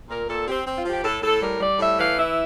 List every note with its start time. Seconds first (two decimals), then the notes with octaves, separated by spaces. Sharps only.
0.09 A#2 A#4
0.28 A#2 A4
0.47 C4 G4
0.67 C4
0.76 F4
0.86 F3 G4
1.04 A2 A4
1.23 A2 A4
1.42 G3 A#4
1.60 G3 D5
1.79 A2 E5
1.99 E3 F5
2.17 E4 E5